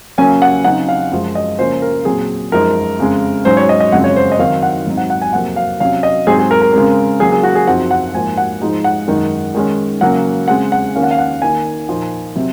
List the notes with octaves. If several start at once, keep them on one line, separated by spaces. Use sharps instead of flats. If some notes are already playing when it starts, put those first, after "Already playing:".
C#3 F#3 A#3 C#4 G#5
F#5
C#3 F#3 C4 D#4 F#5
F5
F#2 F3 G#3
D#5
C#3 F3 A#3 C#4 C5
A#4
A#2 F#3 C4 G#4
F#2 F3 G#3 D#4 A#4
F2 C#3 G#3
G#2 F#3 C#4 C5
C#5
D#5
D#5
F#2 C#3 F3 G#3 C4 F#5
C#5
C5
D#5
D#3 F#3 C4 D#4 F5
F#5
G#2 F#3 C4 D#4
F#5
F#5
G#5
F2 C3 F#3 A#3 F#5
F5
C3 F#3 C#4 F5
D#5
G#2 F#3 C4 G#4
G#4
A#4
A#4
C#3 G#3 C4 A#4
C#3 F#3 A#3 G#4
G#4
F#4
G#4
F#2 F3 C4 D#4 F#5
F#5
G#2 F3 A#3 G#5
F#5
G#2 F3 G#3 D#4
F#5
F#2 D#3 G#3 D#4
D#3 G#3 C#4
C#3 F#3 A#3 F#5
C#3 G#3 C4 F#5
F#5
D#3 A#3 C#4 F5
F#5
F5
F#5
D#3 A#3 D#4 G#5
A#2 F3 A#3 D#4
C3 F#3